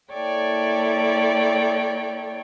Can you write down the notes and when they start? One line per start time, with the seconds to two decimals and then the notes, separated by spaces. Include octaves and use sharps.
0.12 A#3 E4 A4 C#5 D5 G5